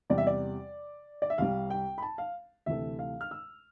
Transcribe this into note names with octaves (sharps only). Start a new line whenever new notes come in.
E2 C3 G3 D5
E5
D5
D5
E5
C2 C3 G3 F5
G5
B5
A5
F5
D2 C3 E3 A3 E5
F5
F6
E6